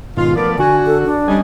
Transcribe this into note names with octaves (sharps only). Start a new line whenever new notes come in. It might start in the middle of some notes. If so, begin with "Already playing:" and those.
G#2 B2 D#3 F4
F3 A3 B3 A#4 D5
D3 F#4 G#5
A4
D4
G3 C#4 D#5 G#5